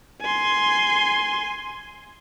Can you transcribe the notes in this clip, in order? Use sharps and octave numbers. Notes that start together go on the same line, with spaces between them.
G#5 C6